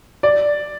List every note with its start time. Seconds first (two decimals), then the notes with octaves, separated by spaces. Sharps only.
0.23 D5